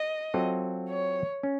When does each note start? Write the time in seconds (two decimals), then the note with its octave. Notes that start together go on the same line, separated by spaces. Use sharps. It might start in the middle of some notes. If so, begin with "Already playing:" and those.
Already playing: D#5
0.34 F#3 C4 F4 A4
0.89 C#5
1.43 C#4